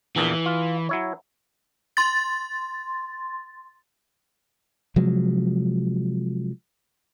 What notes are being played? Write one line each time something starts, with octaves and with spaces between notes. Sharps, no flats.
A#1 E2 A#2 E3
F4
F#3 E4 C#5
C6 A6
C3 F3 F#3 G#3